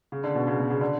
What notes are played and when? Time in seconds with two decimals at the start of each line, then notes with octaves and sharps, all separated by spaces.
0.12 C#3
0.24 D3
0.35 B2
0.47 C#3
0.58 B2
0.70 C#3
0.81 D3